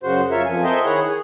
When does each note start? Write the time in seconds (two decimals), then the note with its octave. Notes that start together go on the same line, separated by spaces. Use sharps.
0.03 F#2 C#3 F#4 C5
0.31 F#2 F4 A#4 C#5 E5
0.46 F2 F3 G#5
0.64 A4 A#4 C5 D#5 E5 G5
0.85 D#3 E4 G#4 C#5 F#5
1.08 G#4